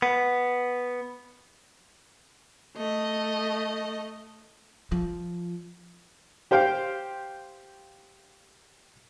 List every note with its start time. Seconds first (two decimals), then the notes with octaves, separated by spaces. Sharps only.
0.02 B3
2.77 A3 D#5
4.92 F3
6.51 G4 C5 F5 G5